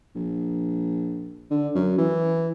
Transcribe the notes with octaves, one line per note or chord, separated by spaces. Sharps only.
A#1
D3
F#2
E3